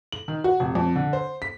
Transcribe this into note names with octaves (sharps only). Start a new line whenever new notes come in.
F#7
D#3
F#4
F1
F2
D3
C5
B6